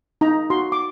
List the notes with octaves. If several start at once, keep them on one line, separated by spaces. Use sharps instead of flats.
D#4 A#5
F#4 C6
D6